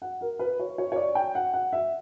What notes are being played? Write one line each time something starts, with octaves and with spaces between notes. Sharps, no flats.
F#5
A#4
B4
C#5
C#5
C#5
D5
G5
F#5
F#5
E5